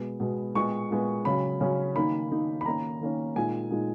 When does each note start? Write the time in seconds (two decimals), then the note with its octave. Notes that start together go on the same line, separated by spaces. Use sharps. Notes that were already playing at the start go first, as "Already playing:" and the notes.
Already playing: B2 G#3 B3
0.20 B2 G#3 B3
0.55 A#2 G#3 B3 C#6
0.91 A#2 G#3 B3
1.25 C#3 F#3 C#4 B5
1.61 C#3 F#3 C#4
1.96 D#3 A#3 D#4 B5
2.30 D#3 A#3 D#4
2.61 B5
2.65 D#3 A#3 C#4 A#5
3.01 D#3 A#3 C#4
3.36 A#2 G#3 D#4 G#5
3.71 A#2 G#3 D#4